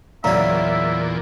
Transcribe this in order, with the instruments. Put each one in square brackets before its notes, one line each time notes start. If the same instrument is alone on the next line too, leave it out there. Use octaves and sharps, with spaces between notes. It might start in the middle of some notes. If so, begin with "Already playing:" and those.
[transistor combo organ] E2 A#2 [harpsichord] C#3 F#3 [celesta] D5 A#5 [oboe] E5